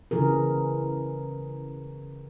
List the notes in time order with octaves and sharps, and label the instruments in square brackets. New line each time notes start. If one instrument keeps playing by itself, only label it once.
[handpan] C#3 E3 G#4 A#4